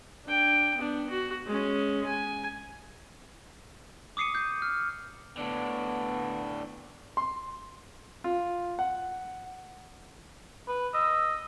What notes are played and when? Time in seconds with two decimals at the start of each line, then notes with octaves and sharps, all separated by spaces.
0.25 D4 G5
0.78 B3 D4
1.10 F#4
1.47 G#3 C#4
2.06 G#5
4.17 D6 D#6 C7 C#7 D#7
4.35 G6
4.62 F6
5.37 A2 D3 B3
7.17 C6
8.24 F4
8.79 F#5
10.68 B4
10.94 D#5 E6